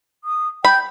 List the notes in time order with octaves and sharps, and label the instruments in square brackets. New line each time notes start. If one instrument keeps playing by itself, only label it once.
[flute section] D#6
[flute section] G5 G6 [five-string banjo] B5